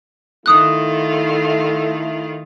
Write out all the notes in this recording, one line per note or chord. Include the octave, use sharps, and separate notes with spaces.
D#3 A3 E4 F4 D#6 F#6